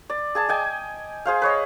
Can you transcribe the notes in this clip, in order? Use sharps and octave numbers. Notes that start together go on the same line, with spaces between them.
D5
G#4 G#5 A5
D#5 G5 G#5
G#4 C5 F5
B4 C#5 D#5